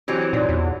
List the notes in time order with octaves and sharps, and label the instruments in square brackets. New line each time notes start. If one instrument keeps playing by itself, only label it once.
[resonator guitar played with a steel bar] E3 F#3 C4 [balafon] G4 G5
[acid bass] A#2 [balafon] D#4 C#5 D5
[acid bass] E2